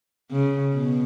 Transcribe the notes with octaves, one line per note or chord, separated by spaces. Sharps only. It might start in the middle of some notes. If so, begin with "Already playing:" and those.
C#3
B2